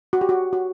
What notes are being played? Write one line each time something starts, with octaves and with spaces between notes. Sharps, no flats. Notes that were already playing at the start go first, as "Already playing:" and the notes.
F#4
G4
F#4
F#4